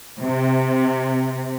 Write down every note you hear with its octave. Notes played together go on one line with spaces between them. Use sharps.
C3